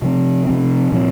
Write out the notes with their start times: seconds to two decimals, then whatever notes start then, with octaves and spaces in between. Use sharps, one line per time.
0.02 C3 F3 C4
0.46 C3 F3 C4
0.92 A#2 F3 C4